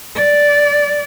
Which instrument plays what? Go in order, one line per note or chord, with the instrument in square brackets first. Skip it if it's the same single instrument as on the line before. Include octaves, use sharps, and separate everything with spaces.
[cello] D5